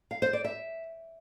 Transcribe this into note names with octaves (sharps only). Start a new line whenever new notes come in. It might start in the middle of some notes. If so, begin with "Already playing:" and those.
F5
C5
D5
E5